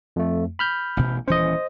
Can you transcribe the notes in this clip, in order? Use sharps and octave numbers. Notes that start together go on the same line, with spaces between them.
F2 A3
B5 F6 G6
A1 B2
D#1 E3 C#4 C5 D#5